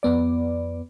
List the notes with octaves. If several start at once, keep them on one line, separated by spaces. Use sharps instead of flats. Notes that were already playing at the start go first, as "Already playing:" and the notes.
F2 B3 D5